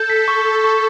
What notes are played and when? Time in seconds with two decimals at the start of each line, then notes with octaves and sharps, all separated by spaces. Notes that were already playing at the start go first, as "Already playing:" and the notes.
Already playing: A4 G6
0.10 B6
0.28 C#6
0.45 C#6
0.64 C#6